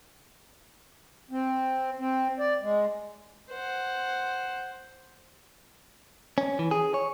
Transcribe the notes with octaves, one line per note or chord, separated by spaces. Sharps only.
C4
C4
D5
G#3
C5 F#5
C#4
E3
G#4
C#5